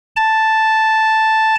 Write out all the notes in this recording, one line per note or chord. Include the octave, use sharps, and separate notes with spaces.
A5